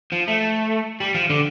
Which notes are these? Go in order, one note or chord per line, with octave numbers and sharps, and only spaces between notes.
F3
A3
G3
F3
D3